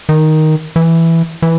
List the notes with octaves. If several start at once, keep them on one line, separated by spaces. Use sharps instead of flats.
D#3
E3
E3